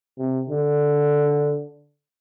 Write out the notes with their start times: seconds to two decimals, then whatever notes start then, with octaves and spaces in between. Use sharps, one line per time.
0.19 C3
0.50 D3